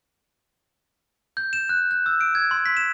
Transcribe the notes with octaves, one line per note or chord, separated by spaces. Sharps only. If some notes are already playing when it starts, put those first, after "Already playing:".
G6
E7
F#6
F#6
E6
D7
G#6
C6
B6
E7